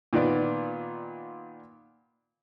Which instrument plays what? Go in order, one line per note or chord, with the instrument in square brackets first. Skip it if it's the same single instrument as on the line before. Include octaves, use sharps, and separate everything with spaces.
[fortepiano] A#2 D#3 B3 D5